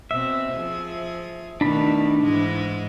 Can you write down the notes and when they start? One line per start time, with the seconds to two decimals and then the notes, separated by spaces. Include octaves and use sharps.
0.11 B2 C4 E5
0.54 F3 G#4
1.61 B2 D#3 A3 D4 B5
2.21 G#2 E3 G#3